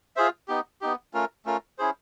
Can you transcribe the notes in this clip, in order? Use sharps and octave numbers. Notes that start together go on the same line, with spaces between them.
F4 G#4 C5 E5
B3 D#4 G4
B3 D#4 G4
A3 C#4 F4 A#4
A3 C#4 F4 A#4
C#4 E4 G#4 C5